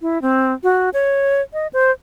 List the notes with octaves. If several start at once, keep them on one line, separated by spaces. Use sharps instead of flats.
E4
C4
F#4
C#5
D#5
C5